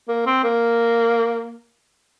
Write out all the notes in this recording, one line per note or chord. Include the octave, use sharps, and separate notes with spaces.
A#3
C4
A#3